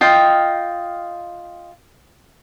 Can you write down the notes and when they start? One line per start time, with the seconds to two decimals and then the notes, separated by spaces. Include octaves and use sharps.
0.01 F4 D#5 G5